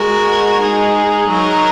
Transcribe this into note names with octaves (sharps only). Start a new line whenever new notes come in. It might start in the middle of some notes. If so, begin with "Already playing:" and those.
Already playing: G#3 F#4 A#4
G#3 D#4 G#4
F#3 D#4 A#4